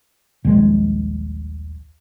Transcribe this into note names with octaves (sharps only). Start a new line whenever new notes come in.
D#1 A#1 D#3 G#3